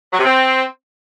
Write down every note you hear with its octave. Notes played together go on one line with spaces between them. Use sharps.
F#3
C3
C4